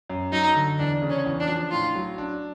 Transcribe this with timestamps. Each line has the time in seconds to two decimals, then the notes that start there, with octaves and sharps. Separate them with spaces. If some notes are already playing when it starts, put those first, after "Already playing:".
0.09 F#2
0.32 F#3 D#4
0.55 D3
0.79 E2 D4
1.02 C#3
1.10 C#4
1.26 E2
1.40 D4
1.48 F3
1.71 A2 F4
1.95 F#3
2.18 D4